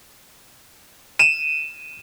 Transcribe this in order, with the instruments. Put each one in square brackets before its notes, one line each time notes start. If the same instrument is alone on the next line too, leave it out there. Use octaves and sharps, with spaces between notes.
[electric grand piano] D#7 E7